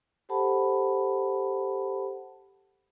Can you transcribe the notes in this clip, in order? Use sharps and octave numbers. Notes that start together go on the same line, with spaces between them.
G4 A4 C5 F#5 A5 B5